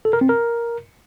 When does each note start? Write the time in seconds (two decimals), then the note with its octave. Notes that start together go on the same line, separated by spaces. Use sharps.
0.05 A4
0.13 A#4
0.21 C4
0.29 A#4